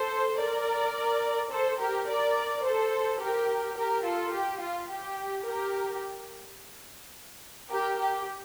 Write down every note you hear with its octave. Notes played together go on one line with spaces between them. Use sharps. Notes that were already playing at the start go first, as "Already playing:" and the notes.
Already playing: A4 C5
A#4 D5
A4 C5
G4 A#4
A#4 D5
A4 C5
G4 A#4
G4 A#4
F4 A4
G4
F4
G4
G4 A#4
G4 A#4
G4